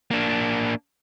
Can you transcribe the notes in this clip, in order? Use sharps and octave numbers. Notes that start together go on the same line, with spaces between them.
A#3 D4